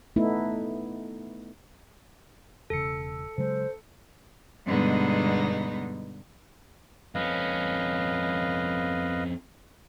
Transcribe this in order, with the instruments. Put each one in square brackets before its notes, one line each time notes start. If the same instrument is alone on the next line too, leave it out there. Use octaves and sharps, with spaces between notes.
[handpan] A3 B3 D#4 E4
[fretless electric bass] E1 C#3 [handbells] A4 C#7
[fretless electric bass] C#3 F#3 G#3 [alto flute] C5
[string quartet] G2 B2 D3 G#3 B3 D#4
[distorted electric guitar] F2 C#4 [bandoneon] B4 D#5 F5